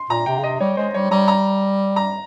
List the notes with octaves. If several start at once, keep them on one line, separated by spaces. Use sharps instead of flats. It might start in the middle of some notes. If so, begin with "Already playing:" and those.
Already playing: C6
A#2 A#5
C3 G5
C#3
C3 D#5
G3 C#5
G#3 C5
G3 C#5
G3 A#5
A#5
A#5